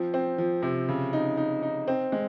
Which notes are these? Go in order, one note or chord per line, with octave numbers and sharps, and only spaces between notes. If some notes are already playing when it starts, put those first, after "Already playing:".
Already playing: F3 C4
C4
F3
C3
C#3
D#4
D#4
D#4
C4
G#3